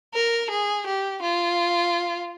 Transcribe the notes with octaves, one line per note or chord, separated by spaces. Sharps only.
A#4
G#4
G4
F4